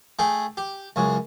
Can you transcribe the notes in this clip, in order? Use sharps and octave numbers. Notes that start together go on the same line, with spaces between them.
A3 G#4 G5
G4
C#2 F#2 C#3